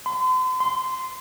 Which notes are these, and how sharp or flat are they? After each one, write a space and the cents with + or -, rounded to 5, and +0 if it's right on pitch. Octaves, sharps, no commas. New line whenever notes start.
C6 -45
C6 -20